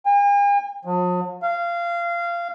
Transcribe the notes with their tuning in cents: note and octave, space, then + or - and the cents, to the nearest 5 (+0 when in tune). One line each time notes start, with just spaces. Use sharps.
G#5 -45
F3 +45
F5 -20